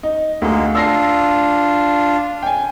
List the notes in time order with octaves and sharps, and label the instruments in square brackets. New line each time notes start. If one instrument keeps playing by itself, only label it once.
[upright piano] D#4
[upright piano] D2 [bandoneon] G#3 A#3
[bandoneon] D4 F4 [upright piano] E6 A#6 C7
[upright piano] G5 G#5